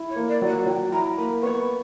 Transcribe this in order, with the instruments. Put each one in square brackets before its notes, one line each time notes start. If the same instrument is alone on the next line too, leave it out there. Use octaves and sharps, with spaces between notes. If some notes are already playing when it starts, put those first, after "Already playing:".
Already playing: [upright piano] E4
[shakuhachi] C#5
[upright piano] A#3
[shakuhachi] D5
[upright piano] F#3
[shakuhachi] F#5
[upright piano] F#3 [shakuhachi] G5
[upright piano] E4 [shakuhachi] A#5
[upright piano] A#3 [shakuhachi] B5
[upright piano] B3 [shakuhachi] C#6